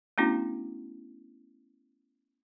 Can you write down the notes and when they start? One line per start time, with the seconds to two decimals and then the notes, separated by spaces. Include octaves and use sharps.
0.18 A3 B3 C#4 D4 E4 F#4